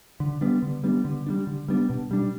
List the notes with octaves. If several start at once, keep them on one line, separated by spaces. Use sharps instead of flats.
D3
G3 B3 D4
D3
G3 B3 D4
D3
G3 B3 D4
D3
G3 B3 D4
B2
G3 D4